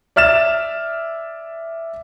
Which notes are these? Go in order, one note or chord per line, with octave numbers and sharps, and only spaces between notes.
D5 E5 F6 A6 E7